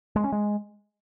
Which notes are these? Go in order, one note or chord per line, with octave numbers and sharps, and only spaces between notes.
G#3
C#4
G#3